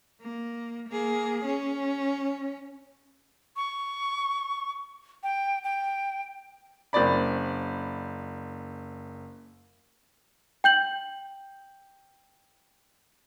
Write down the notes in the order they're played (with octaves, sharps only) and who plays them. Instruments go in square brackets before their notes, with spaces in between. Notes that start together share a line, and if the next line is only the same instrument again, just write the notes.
[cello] A#3
A#3 G#4
C#4
[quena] C#6
G5
G5
[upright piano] F#1 C4 D5 B5
[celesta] G5 G6 F#7